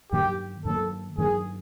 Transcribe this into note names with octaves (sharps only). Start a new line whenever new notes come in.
G2 D#3 F#3 A#3 G4
G2 D#3 F#3 A#3 A4
G2 D#3 F#3 A#3 G#4